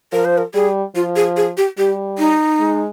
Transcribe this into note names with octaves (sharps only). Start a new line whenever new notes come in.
F3 A#4
C5
A#4
G3 G#4
F3 F4
G#4
G#4
G4
G3 G4
D#4
G#3